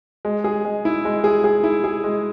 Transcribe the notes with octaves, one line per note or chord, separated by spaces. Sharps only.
G#3
G#4
G#3
E4
G#3
G#4
G#4
E4
G#4
G#3